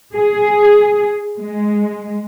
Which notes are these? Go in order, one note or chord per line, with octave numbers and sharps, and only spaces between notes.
G#4
G#3